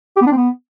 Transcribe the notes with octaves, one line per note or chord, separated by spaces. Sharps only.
G4
B3
D4
C4
B3